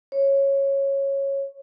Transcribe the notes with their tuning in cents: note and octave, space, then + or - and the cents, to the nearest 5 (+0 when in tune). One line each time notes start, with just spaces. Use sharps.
C#5 -10